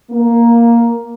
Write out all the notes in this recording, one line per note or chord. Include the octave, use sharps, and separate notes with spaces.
A#3